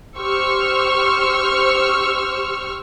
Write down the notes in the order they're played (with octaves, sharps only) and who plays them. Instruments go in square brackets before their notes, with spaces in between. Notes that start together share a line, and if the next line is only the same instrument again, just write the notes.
[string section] G4 C5 C#6 E6 F6